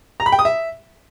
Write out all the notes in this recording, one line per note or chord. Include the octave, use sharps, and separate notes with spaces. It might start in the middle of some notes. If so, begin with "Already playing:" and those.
A#5
B5
G5
D#6
E5